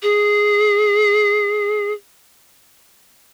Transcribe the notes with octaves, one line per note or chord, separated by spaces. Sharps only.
G#4